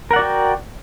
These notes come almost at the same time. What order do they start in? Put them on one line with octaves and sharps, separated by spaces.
A#4 F#5 D5 F#4 G5